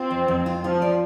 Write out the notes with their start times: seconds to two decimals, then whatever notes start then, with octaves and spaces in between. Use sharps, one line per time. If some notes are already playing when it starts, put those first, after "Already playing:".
Already playing: C4 F4
0.11 F2
0.28 F2
0.46 F4
0.64 F3 F4
0.82 D5